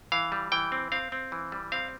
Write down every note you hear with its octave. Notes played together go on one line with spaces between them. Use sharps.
E3 F5
G3
E3 G5
C4
C4 F5
C4
E3
G3
C4 F5